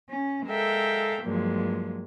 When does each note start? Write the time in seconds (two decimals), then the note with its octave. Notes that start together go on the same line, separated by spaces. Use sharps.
0.11 C#4
0.46 G#3 A4 A#4 E5 F5 G5
1.23 G2 A#2 F3 F#3 G#3